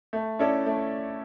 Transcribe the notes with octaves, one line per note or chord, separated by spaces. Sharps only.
A3
C#4 E4 A4 D5
A3